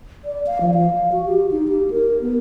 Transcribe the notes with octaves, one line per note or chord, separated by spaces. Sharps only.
D5
F5
F3
F5
F#4
G4
D#4
G4
A#4
B3